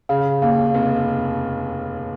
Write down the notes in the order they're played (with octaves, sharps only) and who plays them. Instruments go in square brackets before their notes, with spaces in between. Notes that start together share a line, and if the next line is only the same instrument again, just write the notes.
[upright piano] C#3 [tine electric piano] F5
[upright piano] D#2 [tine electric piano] F5
[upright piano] F1